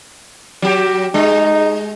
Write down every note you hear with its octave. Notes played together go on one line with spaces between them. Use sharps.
F#3 G4
G#3 D#4